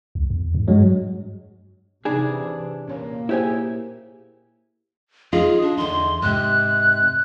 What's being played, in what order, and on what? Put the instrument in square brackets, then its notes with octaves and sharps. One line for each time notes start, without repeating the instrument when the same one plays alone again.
[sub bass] C#2
E2
G#2
[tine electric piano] G2 F#3 G#3
[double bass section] C3 E3 [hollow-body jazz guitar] D4 G#4 [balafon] D#4
[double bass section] A#2 A#3 [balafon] C#4 C#5
[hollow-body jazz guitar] E4 G4 G#5 [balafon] G#4 C5 C#5
[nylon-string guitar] D#4 F4 [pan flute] G#4
[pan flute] D4
[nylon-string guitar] E2 D3 D#4 [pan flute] C6
[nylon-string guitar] G#2 C3 [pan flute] F#6